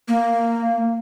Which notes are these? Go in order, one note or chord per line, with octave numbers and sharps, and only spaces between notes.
A#3